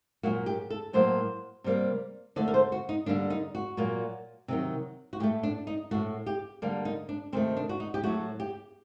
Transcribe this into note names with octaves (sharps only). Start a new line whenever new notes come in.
A#2 F#3 A#3 F#4
G4
A4
A2 F#3 A#3 C5
C3 G3 A#3
D3 A3 D5
A#4
C5
F#4
D#4
D3 G3 A#3 D4
D#4
F#4
A#2 F#3 A#3
C3 D#3 F#3
F#4
A2 A3 G4
D4
D#4
A2 A3 F#4
G4
D3 G3 A#3
D#4
D4
C3 D#3 A3 C4
D4
F#4
D#4
G4
A2 F#3 A3 F#4
G4